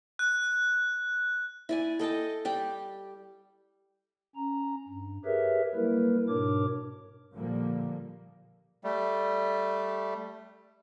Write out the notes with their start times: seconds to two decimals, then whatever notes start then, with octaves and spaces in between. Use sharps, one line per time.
0.19 F#6
1.69 E4 D5 G#5
1.99 A4 D#5 G5 A5
2.45 G3 G4 G5
4.36 C#4 A#5
4.88 G2
5.25 G4 G#4 A#4 B4 C#5 E5
5.75 F#3 G3 A#3 E4 A#4 B4
6.28 G#2 B2 D4 A#4 C#5 D6
7.35 A#2 D3 F3 G3 A#3
8.84 G3 A3